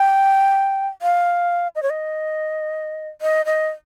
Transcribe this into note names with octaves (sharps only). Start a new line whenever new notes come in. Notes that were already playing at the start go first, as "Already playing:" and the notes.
Already playing: G5
F5
D#5
C#5
D#5
D#5
D#5